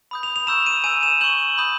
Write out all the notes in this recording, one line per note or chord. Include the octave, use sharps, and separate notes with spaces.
B5 D#6 G6
F7
F7
A#5 C#6 E6 G6 E7
D#7
G#5 C#6 E6 D#7
E7
C#6 E6 G6 F#7
B5 D#6 G6